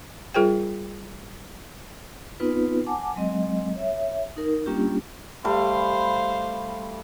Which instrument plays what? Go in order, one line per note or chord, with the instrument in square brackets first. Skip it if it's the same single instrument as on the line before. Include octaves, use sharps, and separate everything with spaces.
[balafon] G3 F4 G#4 A#4 C5 G5
[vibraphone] B3 C4 D#4 F4 B4
F#5 G#5 A5 D6
F#3 G#3 C4 D#5
C#5 E5
D#4 A#4
G3 A#3 C#4 D4 F4 G4
[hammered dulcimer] G3 A3 G5 [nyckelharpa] C5 F5